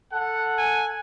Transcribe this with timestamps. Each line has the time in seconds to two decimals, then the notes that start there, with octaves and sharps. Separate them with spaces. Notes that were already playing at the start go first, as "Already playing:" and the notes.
0.13 A4 F#5
0.58 G#5